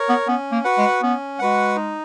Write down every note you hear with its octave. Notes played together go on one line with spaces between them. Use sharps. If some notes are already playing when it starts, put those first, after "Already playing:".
Already playing: A#4 C#5
B3
B3 C#4
A#3
F#4 B4 F#5
G#3
B3 C#4
G#3 F#4 B4 F#5
D#4